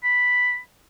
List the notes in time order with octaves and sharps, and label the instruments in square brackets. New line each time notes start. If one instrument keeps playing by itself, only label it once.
[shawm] B5